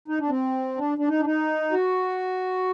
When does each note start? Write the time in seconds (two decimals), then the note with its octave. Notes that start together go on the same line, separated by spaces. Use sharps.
0.08 D#4
0.20 D4
0.29 C4
0.77 D4
0.98 D4
1.08 D#4
1.20 D4
1.25 D#4
1.72 F#4